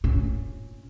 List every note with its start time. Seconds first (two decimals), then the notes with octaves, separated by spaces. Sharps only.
0.04 A#2 C#4